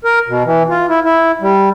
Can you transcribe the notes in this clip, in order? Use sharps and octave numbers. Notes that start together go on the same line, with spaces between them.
A#4
B2
E3
F4
E4
E4
G3